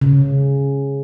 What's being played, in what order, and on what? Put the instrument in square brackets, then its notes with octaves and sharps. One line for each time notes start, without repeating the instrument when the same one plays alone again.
[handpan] C#3